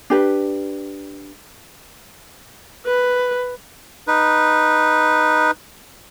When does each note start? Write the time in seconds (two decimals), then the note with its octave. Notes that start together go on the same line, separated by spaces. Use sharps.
0.10 D4 G4 B4
2.86 B4
4.07 D#4 B4